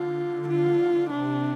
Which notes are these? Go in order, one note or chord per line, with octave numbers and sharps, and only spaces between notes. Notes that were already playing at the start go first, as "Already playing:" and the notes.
Already playing: D3 F4
F4
C3 D4